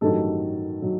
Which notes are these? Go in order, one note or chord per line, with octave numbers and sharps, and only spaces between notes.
A1 G2 D#3 F#3 A4
D#3 F#3